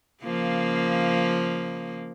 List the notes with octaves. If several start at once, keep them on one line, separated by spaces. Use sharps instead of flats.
C#3 F3 A#3